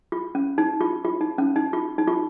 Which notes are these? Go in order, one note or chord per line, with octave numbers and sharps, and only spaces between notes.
F4
C#4
D#4
F4
F4
D#4
C#4
D#4
F4
D#4
F4